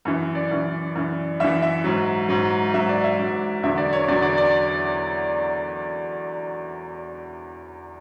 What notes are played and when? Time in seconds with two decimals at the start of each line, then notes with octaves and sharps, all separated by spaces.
0.05 F#2 E3
0.35 D5
0.51 F#2 E3
0.95 F#2 E3
1.40 F#2 E3 E5
1.62 E5
1.84 G#2 F#3
2.29 G#2 F#3
2.74 G#2 F#3 E5
2.89 D5
3.04 E5
3.18 G#2 F#3
3.63 E2 D3 F#3 E5
3.78 D5
3.93 C#5
4.08 E2 D3 F#3 D5
4.22 D5
4.38 D5